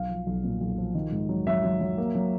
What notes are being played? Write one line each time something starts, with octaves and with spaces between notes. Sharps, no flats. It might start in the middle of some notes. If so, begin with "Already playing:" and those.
Already playing: B1 F5
F3
B1
A#2
B1
F3
D#3
G#2
F#3
F#3 E5
F#3
F#3
A#3
F#3